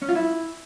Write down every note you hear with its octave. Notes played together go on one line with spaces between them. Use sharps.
C#4
F4
E4